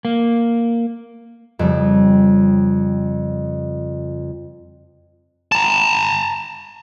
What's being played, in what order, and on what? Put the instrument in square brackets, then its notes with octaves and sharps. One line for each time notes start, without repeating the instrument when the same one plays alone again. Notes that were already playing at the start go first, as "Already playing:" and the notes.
[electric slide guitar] A#3
[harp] F2 C#3 G3
[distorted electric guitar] A5 A#5